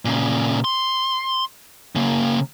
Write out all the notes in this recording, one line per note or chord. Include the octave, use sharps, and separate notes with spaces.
A#2 C#3
C6
C#3 A#3